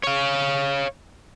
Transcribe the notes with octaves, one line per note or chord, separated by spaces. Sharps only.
C#5 F5